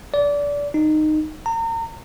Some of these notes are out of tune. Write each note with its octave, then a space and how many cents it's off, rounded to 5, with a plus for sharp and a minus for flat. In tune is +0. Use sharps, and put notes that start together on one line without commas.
D5 -25
D#4 -15
A#5 -35